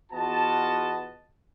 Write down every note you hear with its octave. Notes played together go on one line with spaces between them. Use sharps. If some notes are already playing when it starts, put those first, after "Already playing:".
E2 B3 F4 F#4 D#5 A5